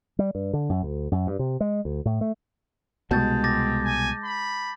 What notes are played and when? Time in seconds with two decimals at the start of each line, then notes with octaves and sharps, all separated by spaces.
0.19 G3
0.35 G2
0.53 D3
0.69 F#2
0.83 D2
1.12 F#2
1.27 G2
1.39 C3
1.60 G#3
1.85 D2
2.05 A2
2.21 A3
3.11 C2 B2 G#3 A5 G6 A6
3.44 C4 D6 A6 A#6
3.85 G#5
4.24 B5